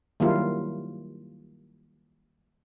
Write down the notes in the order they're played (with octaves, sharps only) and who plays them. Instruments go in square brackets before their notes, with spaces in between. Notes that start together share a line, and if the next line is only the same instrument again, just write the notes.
[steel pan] D#3 F#3 G3 A#3 E4 F4